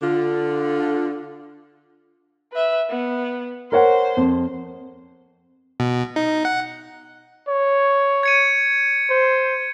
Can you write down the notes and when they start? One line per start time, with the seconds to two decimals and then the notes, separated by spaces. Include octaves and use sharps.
0.03 D3 F4
2.53 B4 E5
2.90 B3
3.72 A#4 C5 C#5 F#5
4.17 F2
5.80 B2
6.16 D#4
6.45 F#5
7.49 C#5
8.23 G#6 C#7 D#7
9.10 C5